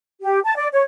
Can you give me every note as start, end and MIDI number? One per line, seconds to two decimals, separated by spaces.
0.22 0.39 67
0.44 0.55 81
0.56 0.67 74
0.72 0.82 73